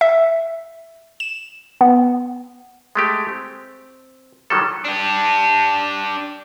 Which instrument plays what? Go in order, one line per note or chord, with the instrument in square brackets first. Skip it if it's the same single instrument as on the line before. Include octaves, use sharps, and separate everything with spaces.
[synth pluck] E5
E7
B3
[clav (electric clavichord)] G#3 A3 G4
C4
D#3 F#3 G3 A4
[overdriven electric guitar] D4 G4